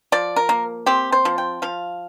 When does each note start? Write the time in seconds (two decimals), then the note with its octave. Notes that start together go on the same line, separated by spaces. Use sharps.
0.12 F3 D5
0.36 A#4
0.49 A#3
0.86 C4 G4
1.12 C5
1.25 F3
1.38 G5
1.62 F3 F5